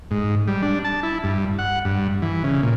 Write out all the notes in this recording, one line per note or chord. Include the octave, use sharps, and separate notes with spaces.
G#2
G3
D4
A5
E4
G2
F#5
G2
E3
C#3
A#2